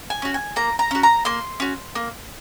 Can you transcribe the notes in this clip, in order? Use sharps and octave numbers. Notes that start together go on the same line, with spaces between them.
G#5
C#4 F#4
G#5
A#3 A#5
A#5
C#4 F#4
A#5
A#3 C6
C#4 F#4
A#3